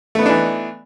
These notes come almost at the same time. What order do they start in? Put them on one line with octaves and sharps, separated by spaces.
A3 B3 D#4 D4 E3